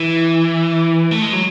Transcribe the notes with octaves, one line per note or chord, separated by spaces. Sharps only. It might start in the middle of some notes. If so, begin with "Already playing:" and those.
Already playing: E3
A3
G#3
F#3